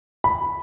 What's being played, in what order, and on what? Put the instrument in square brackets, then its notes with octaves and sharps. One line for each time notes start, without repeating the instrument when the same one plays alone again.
[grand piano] B5